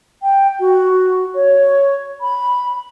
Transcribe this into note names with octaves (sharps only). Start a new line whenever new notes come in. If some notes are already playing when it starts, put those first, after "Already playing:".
G5
F#4
C#5
B5